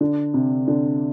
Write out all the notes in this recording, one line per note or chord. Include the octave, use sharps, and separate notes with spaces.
D3
C3
D3